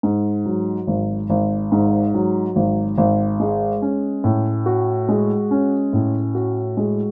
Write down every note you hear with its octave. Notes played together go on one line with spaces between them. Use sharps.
G#2
F#3
G#1
G#1
G#2
F#3
G#1
G#1
G#3
C#4
A2
F#4
G#3
C#4
A2
F#4
G#3